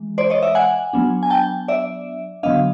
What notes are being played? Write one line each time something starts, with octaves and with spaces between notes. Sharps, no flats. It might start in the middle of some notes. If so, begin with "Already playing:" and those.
Already playing: E3 G#3
C5 D5
C#5 D#5
D5 E5
F#5 G#5
F#3 B3 D4
G#5
G5 A5
D5 E5
D3 F#3 B3 D4 D#5 F5